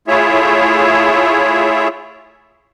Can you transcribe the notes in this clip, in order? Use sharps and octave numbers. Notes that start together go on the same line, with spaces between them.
A3 E4 F4 G#4 C#5 E5